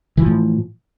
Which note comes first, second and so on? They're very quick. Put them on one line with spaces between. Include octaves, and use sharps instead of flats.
E3 F3 A2